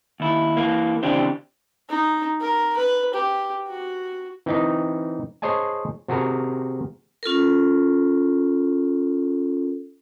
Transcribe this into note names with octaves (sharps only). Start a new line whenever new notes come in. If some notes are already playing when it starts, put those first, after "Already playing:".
D#2 E4
E3 A#3
C#3 E3 C4 D4 G4 C5
D#4
A#4
B4
G4
F#4
E3 C4 D#4 D#5
G#4 C5 C#5 D#5 G#5 A5
C3 F#4 G#4 A#4
C#4 F4 A4 A#4